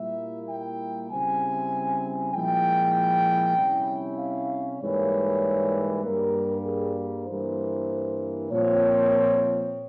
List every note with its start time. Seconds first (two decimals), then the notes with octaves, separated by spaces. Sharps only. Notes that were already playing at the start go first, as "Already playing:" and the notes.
Already playing: A#2 G3 A#3 E4 E5
0.49 G5
1.10 C#3 G3 C4 E4 G#5
2.34 A#2 F3 G#3 E4 G5
3.57 C3 G3 C#4 E4
4.18 F5
4.80 G#2 E3 G3 A#3 C#5
6.03 G2 G3 A#3 A#4
6.65 G#4
7.27 G2 E3 A#3 E4 C5
8.50 A#2 F3 C4 C#5